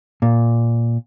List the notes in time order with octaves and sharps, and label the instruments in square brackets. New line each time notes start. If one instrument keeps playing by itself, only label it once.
[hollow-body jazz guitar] A#2